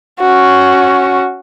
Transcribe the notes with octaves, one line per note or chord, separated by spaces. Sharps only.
C#4 F#4